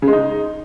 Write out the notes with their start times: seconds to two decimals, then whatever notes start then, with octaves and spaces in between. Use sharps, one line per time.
0.02 C#3
0.08 G#3
0.13 D#4